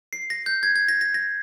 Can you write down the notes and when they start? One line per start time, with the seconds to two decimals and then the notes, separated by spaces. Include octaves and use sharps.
0.13 C7
0.30 A#6
0.46 G6
0.63 G#6
0.76 G#6
0.88 A#6
1.01 A#6
1.14 A#6